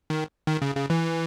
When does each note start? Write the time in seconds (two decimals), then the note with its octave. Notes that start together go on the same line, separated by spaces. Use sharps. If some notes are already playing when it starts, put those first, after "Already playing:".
0.10 D#3
0.47 D#3
0.62 C#3
0.76 C#3
0.90 E3